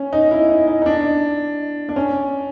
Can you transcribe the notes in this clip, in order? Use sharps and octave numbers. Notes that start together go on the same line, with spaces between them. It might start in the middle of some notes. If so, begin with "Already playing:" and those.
Already playing: C#4
D#4
E4
D#4
D#4
D#4
D4
D4
C#4